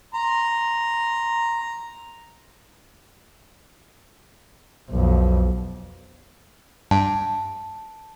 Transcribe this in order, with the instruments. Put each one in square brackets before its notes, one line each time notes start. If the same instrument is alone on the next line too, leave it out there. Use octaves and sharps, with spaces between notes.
[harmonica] A#5 C6
[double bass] B1 F2
[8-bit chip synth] G2 [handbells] A5